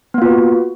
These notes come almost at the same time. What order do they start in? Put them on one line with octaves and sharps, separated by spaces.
B3 A#3 F4 B4 F#4